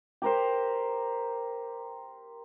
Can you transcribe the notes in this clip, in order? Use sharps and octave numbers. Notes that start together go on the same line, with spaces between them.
G4 A#4 C5